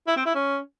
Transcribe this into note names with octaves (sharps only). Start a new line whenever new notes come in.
E4
C4
E4
C#4